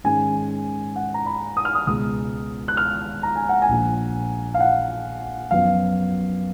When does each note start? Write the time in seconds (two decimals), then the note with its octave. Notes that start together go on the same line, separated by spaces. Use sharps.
0.04 G#2 D#3 G#3 C#4 G#5
0.96 F#5
1.14 A#5
1.26 B5
1.57 D#6
1.65 F6
1.75 D#6
1.87 C#2 B2 G#3 B3 D#6
2.68 F#6
2.77 F6
3.23 A#5
3.36 G#5
3.49 F#5
3.62 G#5
3.68 A#1 A#2 F3
4.54 F5
4.60 F#5
5.51 F#2 F3 B3 F5